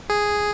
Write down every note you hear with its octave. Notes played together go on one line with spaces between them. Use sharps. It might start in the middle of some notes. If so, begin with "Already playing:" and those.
G#4